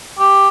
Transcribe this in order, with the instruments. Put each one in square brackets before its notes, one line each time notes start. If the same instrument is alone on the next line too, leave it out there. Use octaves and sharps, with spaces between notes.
[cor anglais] G4